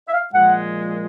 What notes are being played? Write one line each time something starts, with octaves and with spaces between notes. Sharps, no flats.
E5
F5
A#2 F3 G#3 F#5